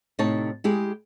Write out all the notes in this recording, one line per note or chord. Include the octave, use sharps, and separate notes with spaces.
A2 C3 D#4 C#5 A5
G#3 E4 G4 G#4